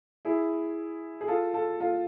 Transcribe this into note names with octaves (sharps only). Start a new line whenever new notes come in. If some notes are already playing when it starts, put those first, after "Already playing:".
E4 G#4
G#4
F4 A4
F4 A4
F4 A4